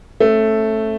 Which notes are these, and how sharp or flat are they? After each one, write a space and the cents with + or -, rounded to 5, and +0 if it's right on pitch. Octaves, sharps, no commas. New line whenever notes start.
A3 +0 C#4 -35